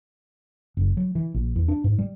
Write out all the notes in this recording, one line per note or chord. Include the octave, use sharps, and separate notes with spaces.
F#1
F#3
E3
A#1
E2
D4
G#2
G3